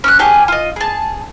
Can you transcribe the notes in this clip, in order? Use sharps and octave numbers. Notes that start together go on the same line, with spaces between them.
C#4 C#6 F#6
C#4 G4 G#4 A5
F4 D#5
G#4 A5